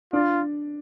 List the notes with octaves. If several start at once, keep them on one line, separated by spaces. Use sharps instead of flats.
D4 F4